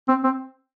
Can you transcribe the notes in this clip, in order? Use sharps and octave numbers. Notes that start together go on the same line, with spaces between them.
C4
C4